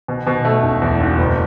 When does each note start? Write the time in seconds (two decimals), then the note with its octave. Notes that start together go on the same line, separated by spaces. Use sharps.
0.08 B2
0.27 B2
0.45 A3
0.63 E1
0.82 E2
1.01 E1
1.18 F#1